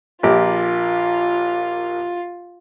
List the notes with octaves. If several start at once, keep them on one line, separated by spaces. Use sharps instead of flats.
A#1 A#3 F4 G4